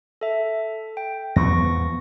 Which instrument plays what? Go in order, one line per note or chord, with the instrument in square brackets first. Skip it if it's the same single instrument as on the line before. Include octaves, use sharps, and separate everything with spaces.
[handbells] A4 E5
G5
[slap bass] E2 F3 B3 [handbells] C#6 A#6